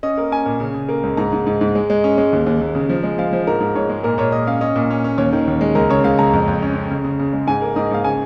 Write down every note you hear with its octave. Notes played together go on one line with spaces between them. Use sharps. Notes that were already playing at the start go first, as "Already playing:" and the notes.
C#4 D#5
A#3
C#4 G#5
A#2
C#3
C#3
A#3
C#2
G#2 A#5
G#2
G#2
G#2
G#3
G#3
C#4
G#3
D#2
D#2
D#2
C#3
F3
G#3
F3 F5
F3
G#2 A#4
G#2
G#2 C#5
G#3
A#2 A#4
A#2 C#5
A#2 D#5
C#4 F5
C#4 D#5
A#2
C#4
C#4
D#2 C#5
D#3
D#2
G#3
C#2 A#4
C#3 C#5
C#2 F5
C#2 A#5
F2
F2
C#4
C#4
C#3
C#3
C#3
G#3
G#2 G#5
A#3
G#2 D#5
G#2 F5
C#3 G#5